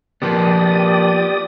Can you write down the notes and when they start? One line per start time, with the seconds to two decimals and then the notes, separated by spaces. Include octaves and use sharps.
0.22 F3 A#3 B3 G4 D5 D#6